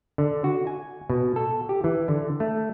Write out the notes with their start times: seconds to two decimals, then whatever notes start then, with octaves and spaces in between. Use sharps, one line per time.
0.18 D3
0.44 F#4
0.67 G#5
1.10 B2
1.36 A4
1.69 G4
1.84 E3
2.08 D3
2.40 A3